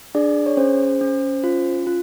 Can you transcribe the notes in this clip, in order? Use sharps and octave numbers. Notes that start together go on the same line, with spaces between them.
D4 G#4 D5
C#5
C#4 C5
C#4
F4
F4